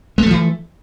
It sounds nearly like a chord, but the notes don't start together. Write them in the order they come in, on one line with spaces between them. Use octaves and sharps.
G#3 A3 F3 E3